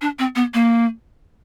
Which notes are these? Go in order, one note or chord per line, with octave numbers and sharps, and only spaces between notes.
D4
C4
B3
A#3